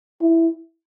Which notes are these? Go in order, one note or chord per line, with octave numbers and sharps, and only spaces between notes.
E4